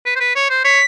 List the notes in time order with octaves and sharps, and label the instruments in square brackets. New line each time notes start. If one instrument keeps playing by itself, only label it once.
[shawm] B4
C5
B4
C#5
C5
[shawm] C#5 [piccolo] B6